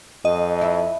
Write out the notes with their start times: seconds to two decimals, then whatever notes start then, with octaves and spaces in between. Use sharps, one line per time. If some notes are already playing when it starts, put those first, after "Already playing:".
0.25 F2 D#5
0.61 E4